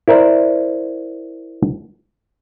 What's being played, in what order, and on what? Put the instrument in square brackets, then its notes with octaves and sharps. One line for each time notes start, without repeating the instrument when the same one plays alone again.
[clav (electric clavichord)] E4 A#4 C5 D5